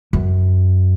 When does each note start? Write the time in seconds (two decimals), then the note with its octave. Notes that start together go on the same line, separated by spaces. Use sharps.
0.13 F#2